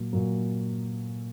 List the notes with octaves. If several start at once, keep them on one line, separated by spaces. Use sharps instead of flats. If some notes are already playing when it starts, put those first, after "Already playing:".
Already playing: A#2 F#3
A#2 F#3